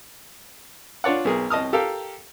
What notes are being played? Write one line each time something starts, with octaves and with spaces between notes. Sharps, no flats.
D4 F4 C#5 D5 F#5
B1 G#4 A#4
C2 D#5 A5 D#6 F6
G4 A4 A#4 F5 G5